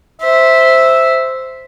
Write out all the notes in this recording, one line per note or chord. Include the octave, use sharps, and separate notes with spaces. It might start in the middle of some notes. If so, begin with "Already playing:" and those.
C5 E5